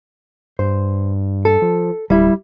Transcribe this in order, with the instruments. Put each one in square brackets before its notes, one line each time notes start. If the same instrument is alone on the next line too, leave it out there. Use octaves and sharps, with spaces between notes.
[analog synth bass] G2 [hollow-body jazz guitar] C5
[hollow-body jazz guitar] A4
[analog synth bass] F3
[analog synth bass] D1 [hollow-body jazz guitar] G3 E4